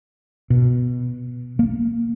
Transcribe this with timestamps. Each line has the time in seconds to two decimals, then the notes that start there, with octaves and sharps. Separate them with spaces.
0.50 B2
1.59 A#3